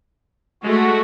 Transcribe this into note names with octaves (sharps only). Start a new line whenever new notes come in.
G#3 A3 F#4